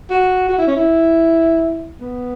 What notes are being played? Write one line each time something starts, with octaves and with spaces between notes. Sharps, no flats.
F#4
F#4
E4
C#4
E4
B3